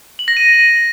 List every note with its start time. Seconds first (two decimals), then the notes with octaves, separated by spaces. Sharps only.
0.19 F#7
0.28 A#6
0.37 D#7